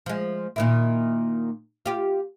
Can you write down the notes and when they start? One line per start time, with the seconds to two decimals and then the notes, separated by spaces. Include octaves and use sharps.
0.06 F3 G#3
0.56 A#2 D#3 E4
1.86 F4 G4